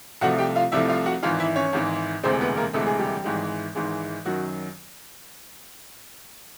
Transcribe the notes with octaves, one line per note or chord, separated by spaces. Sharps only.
C2 C3 F3 A3 F#4 F#5
G4 G5
F4 F5
C2 C3 F3 A3 E4 E5
F4 F5
F#4 F#5
G#1 G#2 E3 F4 F5
E4 E5
C#4 C#5
G#1 G#2 E3
E1 D2 C3 E3 G#3 C4 C5
B3 B4
A#3 A#4
E1 D2 C3 E3 G#3 A3 A4
G#4
G3 G4
G#1 G#2 E3 G#3
G#1 G#2 E3 G#3
F#2 D#3 F#3 F#4